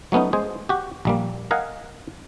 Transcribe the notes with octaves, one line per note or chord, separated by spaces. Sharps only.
F#3 A3 B3 C#4 D#4
G#3 G#4 C5
F#4 G4
A#1 G3 A#3
A#4 D#5 F5 F#5 G#5